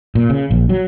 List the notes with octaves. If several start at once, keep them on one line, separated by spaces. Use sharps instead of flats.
A#2
C#3
A#1
F#3